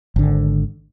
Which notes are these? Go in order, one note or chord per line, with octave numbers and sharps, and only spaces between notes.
G#1 D3